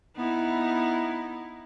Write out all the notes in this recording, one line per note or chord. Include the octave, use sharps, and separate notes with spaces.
B3 D#4 E4